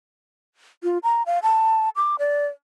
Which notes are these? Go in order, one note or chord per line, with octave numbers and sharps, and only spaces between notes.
F4
A#5
F5
A5
D6
D5